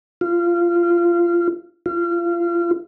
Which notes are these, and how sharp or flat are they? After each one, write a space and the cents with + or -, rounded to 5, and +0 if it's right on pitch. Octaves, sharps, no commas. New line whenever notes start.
F4 -20
F4 -30